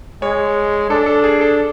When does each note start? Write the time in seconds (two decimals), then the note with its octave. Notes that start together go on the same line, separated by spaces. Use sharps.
0.22 G#3 C#5
0.90 D4 A4
1.06 A4
1.24 G#4
1.41 A4